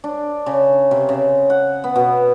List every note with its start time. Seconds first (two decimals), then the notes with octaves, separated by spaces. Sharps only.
0.04 D4
0.46 C#3
0.91 C3
1.09 C#3
1.50 F#5
1.84 B3
1.96 B2